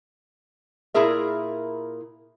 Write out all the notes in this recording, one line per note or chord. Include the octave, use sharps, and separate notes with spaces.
A#2 E4 G#4 A#4 E5